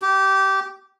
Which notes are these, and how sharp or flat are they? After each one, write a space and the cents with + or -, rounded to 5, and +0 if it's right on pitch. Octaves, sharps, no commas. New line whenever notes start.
G4 -20